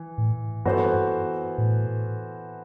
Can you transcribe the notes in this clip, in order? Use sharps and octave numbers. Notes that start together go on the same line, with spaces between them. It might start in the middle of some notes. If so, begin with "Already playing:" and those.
Already playing: E3
A2
G2 E3 B3 F#4 A4 C5
A2